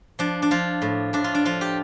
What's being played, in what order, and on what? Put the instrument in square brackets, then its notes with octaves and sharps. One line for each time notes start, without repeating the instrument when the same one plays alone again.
[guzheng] F3 D4
D4
F3 F4
A2
A2 D4
F4
D4
F3 F4
G4